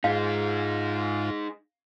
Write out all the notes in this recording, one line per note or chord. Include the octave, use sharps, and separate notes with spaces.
G#2 D#4 F4 G#4 F5